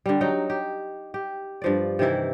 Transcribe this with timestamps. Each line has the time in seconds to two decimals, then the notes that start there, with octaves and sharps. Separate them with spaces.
0.06 D3 G3
0.21 F#3 D#4 G5
0.50 G4
1.14 G4
1.62 G2 F3 D5
1.99 C3 D#3 E3 E4